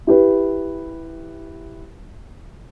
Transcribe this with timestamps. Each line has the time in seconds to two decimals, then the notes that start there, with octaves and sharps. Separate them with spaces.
0.07 E4 G4 B4